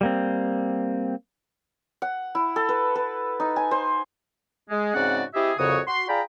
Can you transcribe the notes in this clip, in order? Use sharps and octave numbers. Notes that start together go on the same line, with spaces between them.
G3 A#3 C4
F#5
E4
A4
B4
B4
D#4
G#5
C5
G#3
G#2 C#3 C4 F#4 D5 F#5
C4 E4 G4 G#4 D#5 E5
C2 F2 C#3 F#4 C#5 D#6
F#4 C6
F4 G#4 D5 G5 A#5 B5